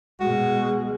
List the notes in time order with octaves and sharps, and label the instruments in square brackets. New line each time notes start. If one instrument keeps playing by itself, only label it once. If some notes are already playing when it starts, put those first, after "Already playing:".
[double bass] B2 G#3 [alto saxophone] F#4